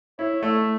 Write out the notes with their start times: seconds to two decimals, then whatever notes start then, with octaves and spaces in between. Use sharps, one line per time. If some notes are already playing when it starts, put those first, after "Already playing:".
0.19 E4 C#5
0.43 A3